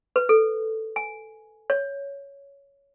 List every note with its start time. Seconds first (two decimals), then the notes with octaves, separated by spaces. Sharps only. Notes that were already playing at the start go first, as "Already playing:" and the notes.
0.16 B4
0.29 A4
0.96 G#5
1.70 C#5